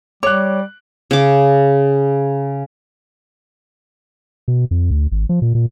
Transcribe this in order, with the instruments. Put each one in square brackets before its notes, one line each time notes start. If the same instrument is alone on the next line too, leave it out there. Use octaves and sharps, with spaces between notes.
[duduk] G3 [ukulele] C#5 [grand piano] D6 F#6
[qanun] C#3 D6
[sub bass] B2
F2
D2
G#1
F3
A#2
A#2